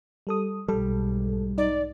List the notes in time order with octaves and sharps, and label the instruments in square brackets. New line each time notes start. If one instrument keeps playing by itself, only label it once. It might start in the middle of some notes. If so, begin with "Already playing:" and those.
[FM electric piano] G3 A4 D#6
[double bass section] B1 G#2 [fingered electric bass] G3 [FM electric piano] A4
[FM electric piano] D#4 [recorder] D5